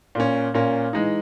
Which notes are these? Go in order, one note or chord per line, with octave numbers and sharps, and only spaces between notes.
A#2 A#3 C#4
A#2 A#3 C#4
E3 G#3 D#4